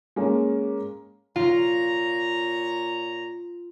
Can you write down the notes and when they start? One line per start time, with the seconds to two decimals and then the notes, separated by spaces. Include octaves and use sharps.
0.16 G#3 A#3 C#4
1.36 A#2 F4 C#5 A#5